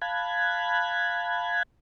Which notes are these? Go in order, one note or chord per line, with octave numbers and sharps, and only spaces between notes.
F5 A5 B5 F#6 G#6